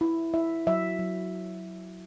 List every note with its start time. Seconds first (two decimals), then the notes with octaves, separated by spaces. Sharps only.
0.01 E4
0.34 E4 E5
0.67 F#3 E5
0.99 F#3